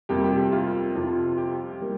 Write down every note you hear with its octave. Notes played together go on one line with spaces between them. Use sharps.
F2 C3 G3 A#3 G4
G4
G4
F4
F2 C3 F3
G4
G3 A#3